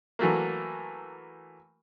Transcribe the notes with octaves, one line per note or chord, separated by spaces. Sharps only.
E3 F#3 A3 A#3